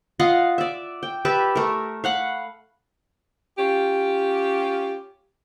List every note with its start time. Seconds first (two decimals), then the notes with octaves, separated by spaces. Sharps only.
0.19 F4 D#5 F5 F#5
0.58 D5 E5
1.03 G5
1.25 G4 B4 E5 A5
1.55 A3 A#4
2.04 F5 F#5 B5
3.58 C#4 F4 G4